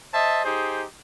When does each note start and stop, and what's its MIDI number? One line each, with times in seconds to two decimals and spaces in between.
0.12 0.41 72
0.12 0.41 75
0.12 0.41 76
0.12 0.41 81
0.44 0.84 63
0.44 0.84 67
0.44 0.84 68
0.44 0.84 72